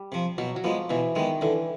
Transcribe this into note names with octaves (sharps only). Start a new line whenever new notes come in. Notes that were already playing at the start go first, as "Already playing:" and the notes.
Already playing: G3
C3 F3
B2 F#3
F#3
F3 G#3 B3
B2 E3
D#3 G#3 B3
D3 E3